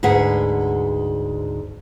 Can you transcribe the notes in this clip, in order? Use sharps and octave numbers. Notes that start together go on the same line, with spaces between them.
D2 G#2 G#4 B4 F#5